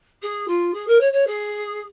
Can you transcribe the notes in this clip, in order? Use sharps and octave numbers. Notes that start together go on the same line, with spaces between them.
G#4
F4
G#4
A#4
C#5
C#5
G#4